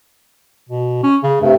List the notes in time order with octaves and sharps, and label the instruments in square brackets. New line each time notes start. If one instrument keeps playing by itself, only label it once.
[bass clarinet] B2
C#4
C#3
[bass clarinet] G2 [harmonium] C3 A3